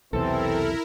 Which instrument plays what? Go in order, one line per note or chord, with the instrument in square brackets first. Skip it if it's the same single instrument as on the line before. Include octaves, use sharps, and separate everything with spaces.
[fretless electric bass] B1 E2 C3 [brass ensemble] E3 C4 [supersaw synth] E4 A#4 [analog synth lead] A4